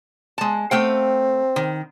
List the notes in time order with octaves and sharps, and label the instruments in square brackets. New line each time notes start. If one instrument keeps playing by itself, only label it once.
[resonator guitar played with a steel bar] G#3 A5
[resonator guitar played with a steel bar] A3 F5 G5 [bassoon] C4
[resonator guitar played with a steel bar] D#3